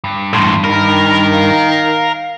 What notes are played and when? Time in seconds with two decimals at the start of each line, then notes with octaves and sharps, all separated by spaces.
0.04 G2
0.33 E2 A2 C6
0.64 D#3 A#4 B5
1.33 F5